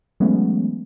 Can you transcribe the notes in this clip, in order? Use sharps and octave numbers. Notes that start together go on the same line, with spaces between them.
E3 F#3 G#3 A3 B3 C#4